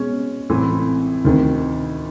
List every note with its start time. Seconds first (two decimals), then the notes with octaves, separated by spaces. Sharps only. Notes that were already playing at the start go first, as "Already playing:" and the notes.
Already playing: B2 G#3 C#4
0.50 A1 A2 E3 A3 C4
1.25 D2 C3 D#3